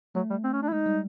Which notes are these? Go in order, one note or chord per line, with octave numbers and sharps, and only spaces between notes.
F#3 A3
G3
C4
C#4
D4
E4
G#3 D#4
G3